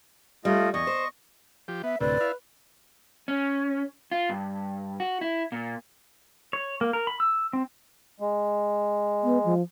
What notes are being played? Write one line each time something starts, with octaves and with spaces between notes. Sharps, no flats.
G3 A3 F4 D#5
E2 D#5 C#6
C5
F3 G4
B3 E5
D2 A2 C3 B4 D5
E4 F5
C#4
F4
G2
F#4
E4
A#2
C#5
A#3
A#4
B5
E6
C4
G#3
B3
F3